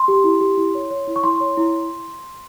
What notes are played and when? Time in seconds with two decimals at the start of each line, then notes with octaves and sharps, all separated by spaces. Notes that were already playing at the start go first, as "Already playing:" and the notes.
Already playing: C6
0.08 G4
0.24 E4
0.41 G4
0.58 E4
0.75 C#5
0.90 C#5
1.07 E4
1.16 C#6
1.24 E4 C6
1.40 C#5
1.57 E4